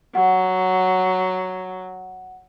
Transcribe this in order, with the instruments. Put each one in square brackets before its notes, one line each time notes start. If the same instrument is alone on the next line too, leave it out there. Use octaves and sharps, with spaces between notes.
[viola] F#3 [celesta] F#5